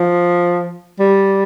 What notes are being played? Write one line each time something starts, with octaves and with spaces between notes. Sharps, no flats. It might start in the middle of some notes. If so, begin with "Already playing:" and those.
Already playing: F3
G3